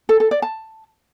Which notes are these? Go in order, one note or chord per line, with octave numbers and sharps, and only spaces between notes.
A4
A4
D5
A5